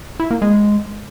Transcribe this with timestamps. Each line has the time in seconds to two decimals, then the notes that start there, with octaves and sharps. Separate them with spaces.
0.20 E4
0.31 A#3
0.42 G#3